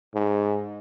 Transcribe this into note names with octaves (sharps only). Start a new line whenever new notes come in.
G#2